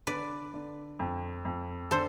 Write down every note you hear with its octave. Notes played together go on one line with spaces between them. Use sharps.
D3 B4 D5
D3
F2
F2
D3 A4 C5